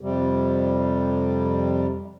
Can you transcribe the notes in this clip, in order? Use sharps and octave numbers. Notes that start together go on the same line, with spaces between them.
F2 C3 G3